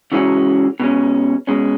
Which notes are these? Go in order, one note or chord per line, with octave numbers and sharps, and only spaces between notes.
C#3 E3 G#3 C#4 F#4
B2 G#3 C#4
B2 G#3 C#4